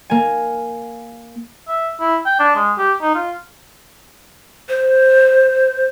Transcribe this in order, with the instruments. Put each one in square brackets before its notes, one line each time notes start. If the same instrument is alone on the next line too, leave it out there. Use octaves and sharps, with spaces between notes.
[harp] A#3 G#5
[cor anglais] E5
E4
G5
D4
G#3
G4
D#4
F4
[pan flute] C5